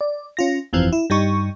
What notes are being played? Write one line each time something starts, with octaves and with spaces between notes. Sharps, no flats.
D5
C#4 F4 A#6
G1 F2 E3 F3 C4
E4
G2 G3 D#4 C#6